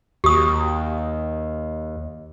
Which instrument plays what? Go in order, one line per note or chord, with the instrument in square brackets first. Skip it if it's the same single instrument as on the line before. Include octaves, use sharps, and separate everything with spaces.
[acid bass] D#2 [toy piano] G4 D#6